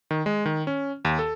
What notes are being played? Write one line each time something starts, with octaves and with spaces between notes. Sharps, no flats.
D#3
G#3
D#3
C#4
D#2
A4